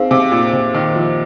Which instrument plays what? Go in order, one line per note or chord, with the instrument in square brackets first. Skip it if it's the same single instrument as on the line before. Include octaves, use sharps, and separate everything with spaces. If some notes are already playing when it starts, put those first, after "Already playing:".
Already playing: [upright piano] C4 [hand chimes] D#4 G#4 F5
[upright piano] C3
A#2
C3
D#3
F3